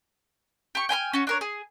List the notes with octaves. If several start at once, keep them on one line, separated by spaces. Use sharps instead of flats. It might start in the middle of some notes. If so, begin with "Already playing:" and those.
G4 C#6
G5 G#5 B5 F6
C#4 F#4
D4 A#4 C#5
G#4